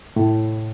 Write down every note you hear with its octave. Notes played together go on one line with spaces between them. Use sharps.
A2